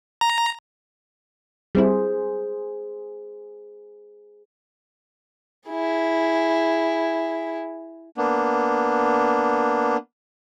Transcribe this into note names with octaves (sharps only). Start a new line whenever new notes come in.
A#5
G3 C4 E4 G#4 C5
E4 G#4
A#3 B3 D4